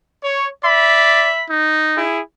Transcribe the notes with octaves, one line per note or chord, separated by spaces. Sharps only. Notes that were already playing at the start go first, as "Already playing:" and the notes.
C#5
D5 E5 B5
D#4
E4 G#4